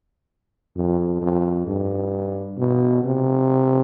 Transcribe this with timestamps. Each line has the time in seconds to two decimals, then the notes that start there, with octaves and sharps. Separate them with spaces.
0.76 F2
1.21 F2
1.67 G2
2.58 B2
3.04 C3